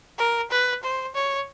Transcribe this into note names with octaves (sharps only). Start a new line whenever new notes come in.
A#4
B4
C5
C#5